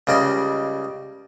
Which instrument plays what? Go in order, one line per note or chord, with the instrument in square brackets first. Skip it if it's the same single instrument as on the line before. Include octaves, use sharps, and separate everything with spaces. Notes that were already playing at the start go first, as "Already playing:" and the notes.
[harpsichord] C#2 C#3 G3 D#5 C6